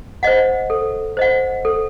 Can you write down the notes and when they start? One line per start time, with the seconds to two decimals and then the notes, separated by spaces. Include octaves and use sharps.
0.23 C5 D#5 F#5
0.70 A4
1.17 C5 D#5 F#5
1.65 A4